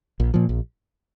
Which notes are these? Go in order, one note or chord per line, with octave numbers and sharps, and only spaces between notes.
A#1
A#2 F3
A#1